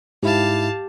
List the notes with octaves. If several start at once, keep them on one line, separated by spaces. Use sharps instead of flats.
G#2 E4 G4 F5 A5